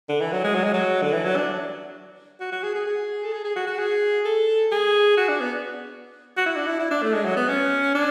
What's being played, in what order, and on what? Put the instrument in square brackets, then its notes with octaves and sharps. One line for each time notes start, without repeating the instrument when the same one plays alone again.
[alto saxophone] D3
E3
F#3
G#3
F#3
G#3
F#3
D3
E3
F#3
D4
F#4
F#4
G#4
G#4
G#4
A4
G#4
G#4
F#4
F#4
G#4
A4
G#4
F#4
D4
B3
F#4
E4
D4
E4
E4
D4
A3
G#3
F#3
B3
C#4
D4